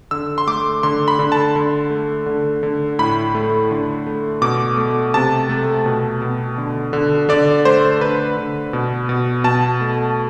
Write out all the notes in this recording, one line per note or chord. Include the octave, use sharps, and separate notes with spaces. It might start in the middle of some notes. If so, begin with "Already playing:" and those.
D3 E6
C6
A3 D6
D3 C6
B5
D3
A5
D3
A3
D3
D3
A2 B5
A3
D3
A3
B2 D6
A3
C3 A5
A3
B2
B2
D3
D3
D3 D5
A3 C5
D3 B4
D3
B2
B2
B2 A5
A3